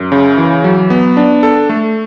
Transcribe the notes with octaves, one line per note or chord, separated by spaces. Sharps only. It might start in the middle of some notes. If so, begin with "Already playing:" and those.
Already playing: F#2
C#3
E3
F#3
B3
D4
A4
A3